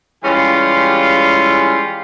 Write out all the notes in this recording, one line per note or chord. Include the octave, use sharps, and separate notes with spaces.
E3 G3 G#3 C#4 F4 G4